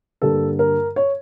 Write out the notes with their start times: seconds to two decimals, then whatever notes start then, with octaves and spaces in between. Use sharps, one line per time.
0.22 G2 D3 G3 A#3 A4
0.59 A#4
0.96 C#5